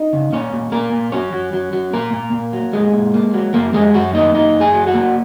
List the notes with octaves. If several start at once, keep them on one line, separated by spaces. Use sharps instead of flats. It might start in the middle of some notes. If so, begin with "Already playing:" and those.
Already playing: D#4 D#5
C#3
A#2 C#4 C#5
A#2
A#2 A#3 A#4
A#2
F#3 C#4 C#5
F#3
F#3
F#3
A#2 A#3 A#4
A#2
A#2
F#3
A#2 G#3 G#4
A#2
A#3
F#3
F#2 A#3 A#4
F#2 G#3 G#4
F#2 F#3 F#4
A#3 D#4 D#5
F#2 D#4 D#5
F#2
G#4 G#5
F#3
F#4 F#5
A#3